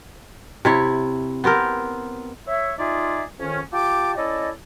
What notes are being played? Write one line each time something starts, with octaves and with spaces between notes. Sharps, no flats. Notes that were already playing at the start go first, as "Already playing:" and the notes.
C3 E4 C#5
B3 C4 G4 A#4
C#5 E5
D#4 F4 G#4 D5 E5
F2 D#3 C#4
F4 G4 G5 A5 D6
C#4 E4 A4 D5 D#5